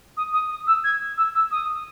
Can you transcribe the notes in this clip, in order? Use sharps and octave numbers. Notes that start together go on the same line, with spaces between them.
D#6
D#6
D#6
E6
G#6
E6
E6
D#6